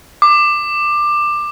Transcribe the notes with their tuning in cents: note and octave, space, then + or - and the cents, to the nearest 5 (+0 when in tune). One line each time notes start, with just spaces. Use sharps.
D6 +15